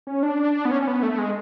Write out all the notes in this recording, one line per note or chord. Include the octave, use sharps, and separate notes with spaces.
C#4
D4
B3
C#4
C#4
B3
A3
G#3